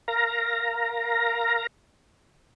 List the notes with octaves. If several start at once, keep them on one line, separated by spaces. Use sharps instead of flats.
A#4 F5 A#5 A#6